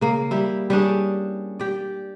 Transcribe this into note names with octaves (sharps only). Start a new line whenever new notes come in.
C#3 A#3
G3 E4
G3 C#4 D4 G#4
G4 D5